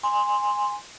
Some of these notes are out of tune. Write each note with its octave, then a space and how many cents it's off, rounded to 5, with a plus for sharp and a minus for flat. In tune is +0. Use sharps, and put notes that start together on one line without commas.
G#5 -10 C6 +0